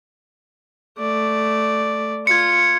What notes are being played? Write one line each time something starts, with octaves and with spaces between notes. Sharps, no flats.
A3 D5
F4 G#6 C#7